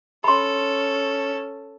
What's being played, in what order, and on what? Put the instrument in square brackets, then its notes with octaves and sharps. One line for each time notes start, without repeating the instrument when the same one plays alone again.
[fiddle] C#4 A4 [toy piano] B5 C6